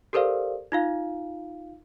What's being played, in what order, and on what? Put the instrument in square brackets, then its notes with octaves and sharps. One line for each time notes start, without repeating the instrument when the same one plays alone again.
[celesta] G4 A4 A#4 C5 D5 F5
D#4 F4 F5